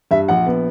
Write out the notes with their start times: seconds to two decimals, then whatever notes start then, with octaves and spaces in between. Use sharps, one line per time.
0.11 G2 E5
0.28 A#1 F#5
0.46 B3